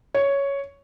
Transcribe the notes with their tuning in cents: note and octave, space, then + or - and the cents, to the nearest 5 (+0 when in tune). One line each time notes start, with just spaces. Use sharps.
C#5 +5